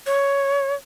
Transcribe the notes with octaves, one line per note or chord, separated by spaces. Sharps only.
C#5